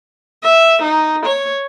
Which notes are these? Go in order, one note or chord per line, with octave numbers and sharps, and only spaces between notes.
E5
D#4
C#5